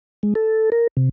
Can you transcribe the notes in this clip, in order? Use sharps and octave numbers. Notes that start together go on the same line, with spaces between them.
G#3
A4
A#4
C3